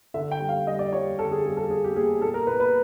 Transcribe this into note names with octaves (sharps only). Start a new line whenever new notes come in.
D3 E5
G5
G3
F5
G3 D#5
D5
G3 C#5
D3 A4
G#4
G3 G#4
A4
G3 G#4
G4
A#3 G#4
A#2 A4
A#4
A#2 B4
B4